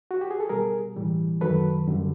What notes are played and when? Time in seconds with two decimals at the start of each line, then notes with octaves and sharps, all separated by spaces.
0.11 F#4
0.21 G4
0.31 G#4
0.40 A4
0.49 B2 G3 G#4 A#4
0.96 A2 E3 G3
1.41 F#2 D#3 F#3 A4 B4
1.87 F#2 D3 G3